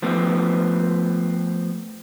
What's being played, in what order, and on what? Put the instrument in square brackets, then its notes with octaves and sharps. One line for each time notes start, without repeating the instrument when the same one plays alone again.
[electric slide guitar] F3 A3 B3 C4